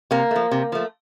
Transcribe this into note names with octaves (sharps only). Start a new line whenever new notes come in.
C3 A#3
F3 A3
C3
F3 A3